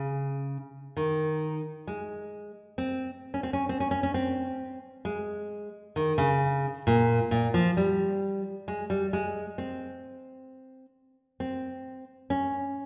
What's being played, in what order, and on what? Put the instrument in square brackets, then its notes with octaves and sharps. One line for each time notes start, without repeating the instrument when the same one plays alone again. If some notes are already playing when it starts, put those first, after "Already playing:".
Already playing: [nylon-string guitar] C#3
D#3
G#3
C4
C#4
C4
C#4
C4
C#4
C#4
C#4
C4
G#3
D#3
C#3
A#2
A#2
F3
G3
G#3
G3
G#3
C4
C4
C#4